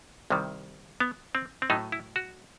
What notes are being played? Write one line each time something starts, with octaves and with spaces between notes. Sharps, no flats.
C2 C3 D#3 G3
B3
C4
C4
A2 F#3 A3 D#4
E4
F#4